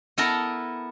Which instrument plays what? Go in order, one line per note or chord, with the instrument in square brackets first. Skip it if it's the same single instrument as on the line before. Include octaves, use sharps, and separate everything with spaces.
[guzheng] B3 E4 A4 A#4 A#5